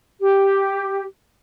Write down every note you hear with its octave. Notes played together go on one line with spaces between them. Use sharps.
G4